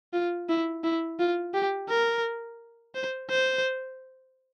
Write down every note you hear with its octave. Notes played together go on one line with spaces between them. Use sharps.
F4
E4
E4
F4
G4
A#4
C5
C5